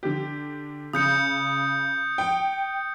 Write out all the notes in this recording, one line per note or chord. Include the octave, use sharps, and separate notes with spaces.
D3 G4
C#3 D#6 G6 C#7
G5